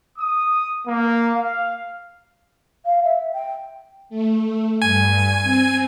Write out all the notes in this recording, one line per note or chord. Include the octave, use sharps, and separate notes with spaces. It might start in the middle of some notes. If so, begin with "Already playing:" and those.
D#6
A#3
F5
F5
E5
G5
A3
G2 G#5
C4